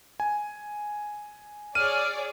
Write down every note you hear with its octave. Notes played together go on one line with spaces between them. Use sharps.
G#5
G#4 C#5 D5 F6 D#7